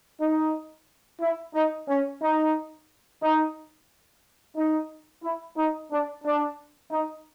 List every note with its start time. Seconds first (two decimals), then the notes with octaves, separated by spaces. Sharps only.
0.21 D#4
1.21 E4
1.55 D#4
1.89 C#4
2.22 D#4
3.22 D#4
4.57 D#4
5.24 E4
5.57 D#4
5.92 D4
6.24 D4
6.91 D#4